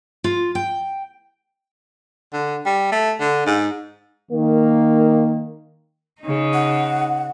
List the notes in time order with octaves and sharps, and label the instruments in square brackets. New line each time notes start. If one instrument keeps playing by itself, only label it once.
[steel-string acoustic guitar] F4
G5
[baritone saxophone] D3
G3
A3
D3
G#2
[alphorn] D#3 [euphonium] A#3
[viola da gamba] C#3 D#4
[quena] F#5